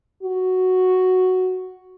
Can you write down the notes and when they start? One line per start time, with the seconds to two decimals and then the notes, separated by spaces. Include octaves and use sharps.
0.23 F#4